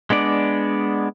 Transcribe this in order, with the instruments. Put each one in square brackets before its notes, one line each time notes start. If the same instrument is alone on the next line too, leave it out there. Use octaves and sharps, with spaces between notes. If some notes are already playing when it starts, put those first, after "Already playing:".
[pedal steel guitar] G#3 B3 D4 D5